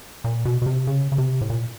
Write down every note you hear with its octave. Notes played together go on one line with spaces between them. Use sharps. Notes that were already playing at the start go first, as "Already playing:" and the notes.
A#2
B2
B2
C3
C#3
C#3
C3
A2
A#2